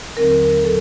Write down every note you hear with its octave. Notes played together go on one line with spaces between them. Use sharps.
D#2 D3 F#3 C4 A#4
A#4
A2 F#3 A4